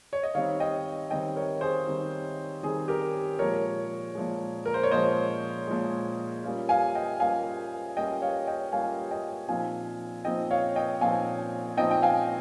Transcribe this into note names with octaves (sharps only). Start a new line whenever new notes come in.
C#5
D#5
D#3 G3 C4 D#4 C#5 F5
D#5 G5
D#3 G3 C4 D#4 D#5 G5
A#4 C#5
G#4 C5
D#3 G3 C4 D#4
D#3 G3 C4 D#4 G#4
G4 A#4
A#2 F3 G#3 A#4 C#5
A#2 F3 G#3
A#4
C5
C#5
A#2 F3 G#3 C5 D#5
A#2 F3 G#3
G3 A#3 C#4 F4
F5 G#5
D#5 G5
G3 A#3 C#4 F4 F5 G#5
G3 A#3 C#4 F4 D#5 G5
C#5 F5
D#5 G5
G3 A#3 C#4 F4 F5 G#5
D#5 G5
A#2 F3 C4 D#4 F5 G#5
A#2 F3 C4 D#4 D#5 G5
C#5 F5
D#5 G5
A#2 F3 C4 D#4 F5 G#5
A#2 F3 C4 D#4 D#5 G5
G5
F5 G#5